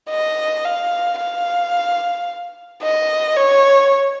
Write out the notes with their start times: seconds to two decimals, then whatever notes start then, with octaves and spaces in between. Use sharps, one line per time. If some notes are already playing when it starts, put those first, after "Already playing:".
0.10 D#5
0.64 F5
1.19 F5
2.83 D#5
3.36 C#5